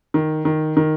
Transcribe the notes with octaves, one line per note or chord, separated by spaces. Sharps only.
D#3
D#3
D#3